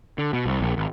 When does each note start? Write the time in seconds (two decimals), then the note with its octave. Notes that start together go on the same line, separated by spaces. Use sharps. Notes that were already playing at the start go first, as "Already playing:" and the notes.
0.18 D3
0.33 B2
0.46 C2
0.61 A#1
0.76 G#1